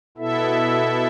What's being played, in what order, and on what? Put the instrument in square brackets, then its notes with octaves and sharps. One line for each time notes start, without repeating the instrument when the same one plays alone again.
[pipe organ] B2 B3 E4 A4 E5